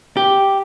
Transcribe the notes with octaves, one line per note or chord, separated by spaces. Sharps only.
G4